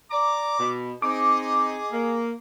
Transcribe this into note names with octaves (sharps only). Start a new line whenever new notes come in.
D5 A#5 D6
B2
C4 D#4 G#4 D#5 D6
A#3